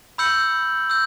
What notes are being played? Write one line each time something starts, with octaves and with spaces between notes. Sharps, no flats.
B5 E6 G6 C#7 F#7
E6 G6